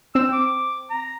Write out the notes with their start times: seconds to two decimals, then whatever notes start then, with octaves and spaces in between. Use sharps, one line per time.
0.15 C4 E6
0.33 D6
0.90 A#5